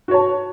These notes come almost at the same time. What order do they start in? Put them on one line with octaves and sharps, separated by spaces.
F#4 C#5 A5